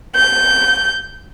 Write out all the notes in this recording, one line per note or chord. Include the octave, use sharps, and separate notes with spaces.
G6